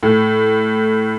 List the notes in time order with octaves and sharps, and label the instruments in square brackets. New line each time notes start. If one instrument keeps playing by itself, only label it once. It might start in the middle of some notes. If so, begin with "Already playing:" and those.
[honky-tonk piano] A2